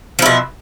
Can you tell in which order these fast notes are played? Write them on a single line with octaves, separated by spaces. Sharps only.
F3 E4 B2